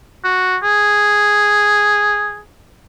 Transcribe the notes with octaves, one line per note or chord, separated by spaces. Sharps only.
F#4
G#4